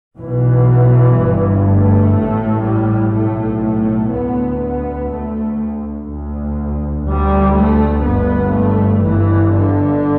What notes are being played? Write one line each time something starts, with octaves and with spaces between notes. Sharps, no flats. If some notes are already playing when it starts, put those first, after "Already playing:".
B1 B2 E3
G1 G2
A3
A1 A2
G3
B1 A2 A3
A3
D2 B3
B3
D2 A3
D2
D2 G3
A3
G1 G2 B3
A3
G1 G2 E3
D3